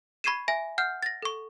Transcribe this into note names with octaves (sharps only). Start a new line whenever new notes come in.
B5 C#6 G#6 C7 D#7 E7
E5 G#5 A#6
F#5 F6 G6
A6 A#6
A4 C#6